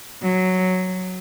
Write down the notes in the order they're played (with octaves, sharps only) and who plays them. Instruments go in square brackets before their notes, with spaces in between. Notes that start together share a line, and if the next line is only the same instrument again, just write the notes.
[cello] F#3